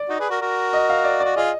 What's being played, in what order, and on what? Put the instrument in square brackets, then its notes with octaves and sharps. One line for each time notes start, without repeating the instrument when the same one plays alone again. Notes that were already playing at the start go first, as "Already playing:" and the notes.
Already playing: [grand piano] D5
[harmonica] D#4 F#4
G#4 B4
F#4 A#4
F#4 A#4
[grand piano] D#5
F5
D5
[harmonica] F#4 [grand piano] D5
[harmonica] F4 G#4 [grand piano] D#5